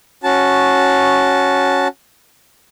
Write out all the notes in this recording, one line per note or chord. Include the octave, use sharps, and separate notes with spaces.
C#4 F#4 A5